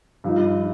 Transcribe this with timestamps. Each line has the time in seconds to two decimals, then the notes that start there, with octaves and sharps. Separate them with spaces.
0.24 G2 F3 D#4